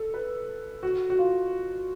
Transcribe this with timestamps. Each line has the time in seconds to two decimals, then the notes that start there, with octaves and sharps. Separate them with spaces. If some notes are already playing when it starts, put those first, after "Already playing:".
Already playing: A4
0.14 B4
0.83 F#4
1.10 F#4
1.19 F4